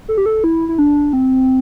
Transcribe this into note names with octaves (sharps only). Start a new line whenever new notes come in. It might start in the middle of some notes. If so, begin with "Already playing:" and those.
A4
G4
A4
E4
E4
D4
C4